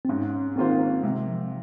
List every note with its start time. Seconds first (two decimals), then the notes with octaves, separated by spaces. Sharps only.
0.05 C4
0.09 G#2 C#4
0.56 D#3 A#3 C4 F4 C5
1.03 C3 G#3
1.27 F3